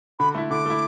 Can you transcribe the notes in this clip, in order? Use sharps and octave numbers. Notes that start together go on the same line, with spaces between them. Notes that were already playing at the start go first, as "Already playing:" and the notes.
D3 B5
A3 E4
D3 D6
A3 E4